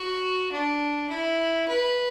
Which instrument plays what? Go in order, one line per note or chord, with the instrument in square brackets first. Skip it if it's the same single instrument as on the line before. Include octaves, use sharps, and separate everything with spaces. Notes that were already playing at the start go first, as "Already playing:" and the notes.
Already playing: [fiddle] F#4
D4
E4
B4